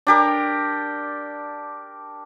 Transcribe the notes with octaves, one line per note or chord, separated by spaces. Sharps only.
D4 G4 A#4